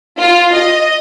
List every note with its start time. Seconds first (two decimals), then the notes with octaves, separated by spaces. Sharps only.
0.19 F4
0.54 D#5